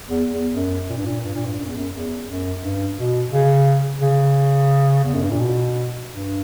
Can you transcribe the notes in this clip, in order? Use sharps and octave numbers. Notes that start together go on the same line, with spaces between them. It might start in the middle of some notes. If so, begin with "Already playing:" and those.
E2
E2
F#2
A#2
G2
A#2
G2
A#2
G2
F#2
E2
F#2
E2
F#2
G2
B2
C#3
C#3
E2
F#2
G2
A#2
B2
G2